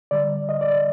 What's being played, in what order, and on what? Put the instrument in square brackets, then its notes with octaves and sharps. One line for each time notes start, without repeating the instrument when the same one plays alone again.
[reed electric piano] D3 G3 D5
D#5
D5